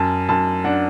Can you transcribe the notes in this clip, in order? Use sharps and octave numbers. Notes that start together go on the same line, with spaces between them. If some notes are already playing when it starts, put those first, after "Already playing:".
Already playing: F#2 A5
F#2 A5
D4 F#5